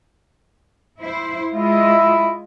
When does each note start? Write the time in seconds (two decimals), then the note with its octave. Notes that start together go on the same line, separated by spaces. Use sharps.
1.01 E4 C5
1.53 G#3 E4 F4 D#5